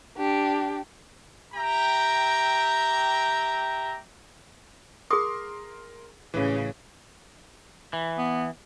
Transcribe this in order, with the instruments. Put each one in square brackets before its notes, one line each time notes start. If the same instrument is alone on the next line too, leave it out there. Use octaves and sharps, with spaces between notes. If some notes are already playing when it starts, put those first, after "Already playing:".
[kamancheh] D4 G4
[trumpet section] G4 E5 G5 A#5
[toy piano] G#4 D#6 [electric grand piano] A#4 C6
[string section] A1 C#3 [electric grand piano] E3 B4
[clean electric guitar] E3
[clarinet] B3